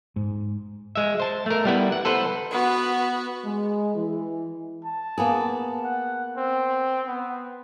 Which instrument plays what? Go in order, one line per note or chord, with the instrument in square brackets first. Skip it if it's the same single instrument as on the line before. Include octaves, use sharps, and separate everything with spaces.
[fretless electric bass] G#2
[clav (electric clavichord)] G#3 E5
C5 A5
A3 A#4
G3 B3 E4
F#5
A4 B4 C5 F#5
[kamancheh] B3 F#4
[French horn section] G#3
E3
[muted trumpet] A5
[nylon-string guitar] A#3 B3 G#4
[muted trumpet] F#5
C4
B3